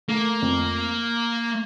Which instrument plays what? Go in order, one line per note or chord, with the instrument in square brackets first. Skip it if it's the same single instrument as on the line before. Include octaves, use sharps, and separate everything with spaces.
[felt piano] A3 [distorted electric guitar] A#3
[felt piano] F2